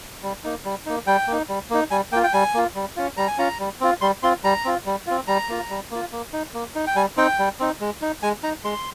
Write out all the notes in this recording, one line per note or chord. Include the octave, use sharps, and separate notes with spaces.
G3
A#3 D#4
G3
A#3 D#4
G3 G5
A#3 D#4
G3
A#3 D#4
G3 G#5
A#3 F4 G5
G5
G3 G#5
A#3 F4
G3
C#4 F4
G3 A#5
G#5
C#4 F4 A#5
G3
C4 F4
G3 C6
C4 F4 C6
G3 A#5
C4 F4
G3
C4 F4
G3 A#5
A#3 F4
G3
A#3 F4
A#3
D#4
A#3
D#4
G5
G3 G#5
C4 D#4 G5
G3
C4 D#4
G#3
D#4
G#3 G#5
D#4 A#5
G#3 C6